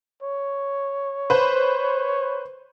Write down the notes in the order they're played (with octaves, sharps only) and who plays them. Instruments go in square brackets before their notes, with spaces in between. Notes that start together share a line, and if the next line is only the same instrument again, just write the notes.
[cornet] C#5
[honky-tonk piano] B4 C5